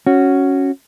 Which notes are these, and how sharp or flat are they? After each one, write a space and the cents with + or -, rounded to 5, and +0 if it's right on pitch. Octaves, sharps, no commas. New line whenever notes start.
C#4 +0 F#4 +0